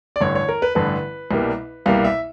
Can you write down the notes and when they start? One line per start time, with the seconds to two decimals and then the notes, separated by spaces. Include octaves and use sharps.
0.16 D5
0.20 A1 G2 D3 C#5
0.35 C#5
0.49 A#4
0.62 B4
0.75 A1 G2 D3 B4
1.31 C2 B2 G3 A#3
1.86 C2 B2 G3 A#3 F5
2.04 E5